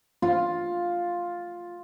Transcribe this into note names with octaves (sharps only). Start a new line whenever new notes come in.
F4